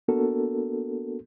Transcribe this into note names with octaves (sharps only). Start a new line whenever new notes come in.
A#3 B3 D4 F#4 A4 A#4